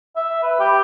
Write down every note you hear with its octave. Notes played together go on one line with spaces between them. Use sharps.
E5
B4
G4